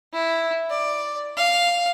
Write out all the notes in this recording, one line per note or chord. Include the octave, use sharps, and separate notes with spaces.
E4
D5
F5